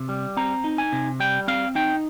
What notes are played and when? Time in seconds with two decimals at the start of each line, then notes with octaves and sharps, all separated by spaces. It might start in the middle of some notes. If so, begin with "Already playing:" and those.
Already playing: C3
0.09 G3
0.37 C4 A#5
0.64 D#4
0.78 G#5
0.92 C3
1.20 G3 G5
1.48 C4 F5
1.75 D#4 G5